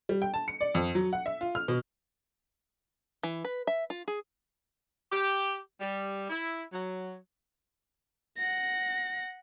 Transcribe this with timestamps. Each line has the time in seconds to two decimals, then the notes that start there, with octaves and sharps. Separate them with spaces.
0.09 G3
0.22 G5
0.34 A5
0.48 C#7
0.61 D5
0.75 F2
0.95 F#3
1.13 F#5
1.26 E5
1.41 F4
1.55 F6
1.68 B2
3.23 E3
3.45 B4
3.67 E5
3.90 F4
4.08 G#4
5.12 G4
5.80 G3
6.29 E4
6.73 F#3
8.37 F#5 A#6